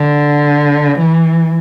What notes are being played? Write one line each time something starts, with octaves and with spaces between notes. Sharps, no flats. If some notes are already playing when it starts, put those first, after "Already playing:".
Already playing: D3
E3